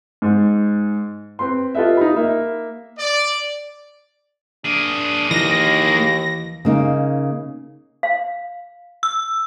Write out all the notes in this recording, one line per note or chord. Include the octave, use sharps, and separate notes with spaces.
G#2
C4 B4 C6
F4 G4 A4 B4 D#5 E5
D#4 B5
A#3 E5
D5
A#3 D4 G#4
D#2 E3 D#4 A#6
C#3 A#3 D#4
F5
E6